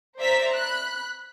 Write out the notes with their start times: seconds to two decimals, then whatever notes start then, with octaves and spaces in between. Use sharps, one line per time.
0.19 C5 D5 E5 A#5 B6
0.54 B5 F#6